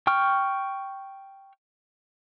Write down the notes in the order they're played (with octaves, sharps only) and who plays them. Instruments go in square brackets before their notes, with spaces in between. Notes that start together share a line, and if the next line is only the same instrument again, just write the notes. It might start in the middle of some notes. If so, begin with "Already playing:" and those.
[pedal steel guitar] G5 C#6 F6